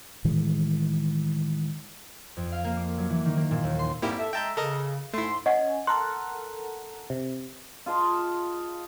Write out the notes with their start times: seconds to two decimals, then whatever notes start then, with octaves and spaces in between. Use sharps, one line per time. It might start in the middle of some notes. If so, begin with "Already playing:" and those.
0.25 A2 D#3 E3 G#3
2.37 F2
2.52 F5
2.64 A#3
2.77 D6
2.98 F#3
3.10 E3
3.25 D#3
3.37 A#3
3.51 A#2
3.64 D#2
3.79 C6
4.02 F2 G#2 G3 A#3 E4 G4
4.18 A4 E5
4.33 G#3 E5 G5 A5 A#5 G6
4.57 C#3 A4 A#4 D#5
5.14 G#2 A3 E4 C6
5.46 C#4 D#5 F#5 G#5
5.87 A4 A#4 F#5 C6
7.10 C3
7.86 F4 G#4 D#5 A5